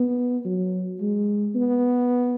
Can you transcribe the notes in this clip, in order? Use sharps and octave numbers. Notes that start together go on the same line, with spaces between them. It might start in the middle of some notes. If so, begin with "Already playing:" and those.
Already playing: B3
F#3
G#3
B3